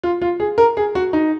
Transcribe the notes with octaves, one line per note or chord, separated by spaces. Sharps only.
F4
F4
G#4
A#4
G#4
F#4
D#4